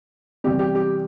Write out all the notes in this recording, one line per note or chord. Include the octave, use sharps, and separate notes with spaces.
E2 C3 G3 G4
G4
G4